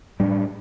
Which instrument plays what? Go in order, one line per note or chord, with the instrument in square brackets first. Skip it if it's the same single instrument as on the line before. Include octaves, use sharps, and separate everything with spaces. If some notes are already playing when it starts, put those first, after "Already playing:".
[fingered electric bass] A2 G3 D4